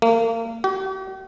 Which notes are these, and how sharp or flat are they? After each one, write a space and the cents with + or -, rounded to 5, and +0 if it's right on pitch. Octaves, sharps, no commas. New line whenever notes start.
A#3 -30
G4 -45